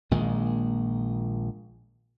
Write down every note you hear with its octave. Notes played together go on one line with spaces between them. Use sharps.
A#1 A#2 D#3 G#3